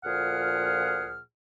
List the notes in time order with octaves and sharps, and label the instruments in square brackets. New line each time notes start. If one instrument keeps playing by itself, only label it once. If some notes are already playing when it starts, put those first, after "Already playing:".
[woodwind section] D2 A#2 F3 G#4 F#5 F6